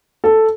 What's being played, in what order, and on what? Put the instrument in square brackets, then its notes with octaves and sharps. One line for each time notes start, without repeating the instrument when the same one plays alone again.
[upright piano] A4